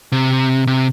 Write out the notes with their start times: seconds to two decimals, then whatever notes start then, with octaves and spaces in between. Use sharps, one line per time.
0.12 C3
0.67 C3